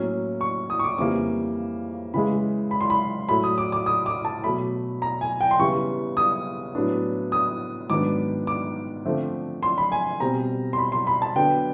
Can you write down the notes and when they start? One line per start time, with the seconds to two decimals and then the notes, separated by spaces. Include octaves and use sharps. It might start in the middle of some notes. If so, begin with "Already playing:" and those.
Already playing: A2 F#3 A#3 C#4
0.41 C#6
0.70 D#6
0.79 C#6
0.84 D6
0.98 F2 C#3 E3 G3 A#3 D6
2.14 C#3 E3 G#3 B5
2.71 B5
2.81 C6
2.90 B5
3.29 A2 F#3 A3 B5
3.44 D#6
3.58 D6
3.72 D6
3.86 D#6
4.06 D6
4.25 A5
4.44 B2 F#3 A3 B5
5.02 A#5
5.21 G#5
5.41 G5
5.51 C6
5.59 C#3 E3 G3 B3 C#6
6.17 D#6
6.75 A2 F#3 B3 D4
7.32 D#6
7.90 G#2 D#3 F#3 B3 D4 D6
8.47 D6
9.05 D3 F3 A3 C4
9.63 C6
9.78 B5
9.92 G#5
10.20 B2 G3 C4 A#5
10.73 C6
10.78 B5
10.92 C6
11.07 B5
11.22 A5
11.36 D3 F#3 B3 D4 G5